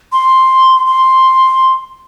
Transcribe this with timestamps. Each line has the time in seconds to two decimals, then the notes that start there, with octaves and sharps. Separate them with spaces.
0.12 C6
0.86 C6